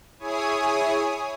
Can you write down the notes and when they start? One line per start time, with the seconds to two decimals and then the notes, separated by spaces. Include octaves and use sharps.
0.19 E4 G#4 C#5 G#5 D#6